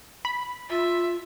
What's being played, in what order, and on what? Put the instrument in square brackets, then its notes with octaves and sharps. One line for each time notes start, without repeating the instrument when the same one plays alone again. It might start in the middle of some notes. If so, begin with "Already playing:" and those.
[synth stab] B5
[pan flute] F4 [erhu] E5